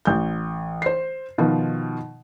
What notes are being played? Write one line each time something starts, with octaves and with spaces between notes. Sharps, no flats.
A1 G6
C5 C7
B2 D#3 F3